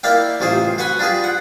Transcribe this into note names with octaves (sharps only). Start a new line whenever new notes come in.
A#3 E4 A#4 D5 F5 G5
A1 C3 F4 G#4 C5
F#4 B4 F#5 G#5 B5
D4 F4 G4 G#4 B4
F#5